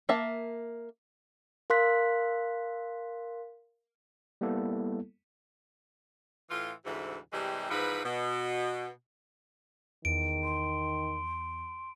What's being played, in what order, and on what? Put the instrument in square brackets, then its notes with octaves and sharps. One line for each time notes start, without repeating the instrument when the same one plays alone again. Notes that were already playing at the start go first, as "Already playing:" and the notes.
[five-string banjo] A#3 E5 A5
[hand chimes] A#4 F5 C6 F#6 B6
[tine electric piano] G3 A#3 B3 E4 A4
[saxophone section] A2 E3 F4
D2 G#2 C3 E3
C3 E3 G3 G#3 E4
G#2 E3 F3 B4
B2
[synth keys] E2 [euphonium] D#3 [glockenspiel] D7
[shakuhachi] C6